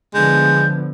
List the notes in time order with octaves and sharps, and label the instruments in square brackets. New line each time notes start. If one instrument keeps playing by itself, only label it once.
[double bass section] D3 F3 B3 [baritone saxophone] G#3 [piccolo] G6